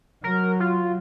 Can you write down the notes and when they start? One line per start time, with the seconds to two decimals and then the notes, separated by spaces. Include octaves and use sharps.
0.24 F#3 A#4
0.60 F4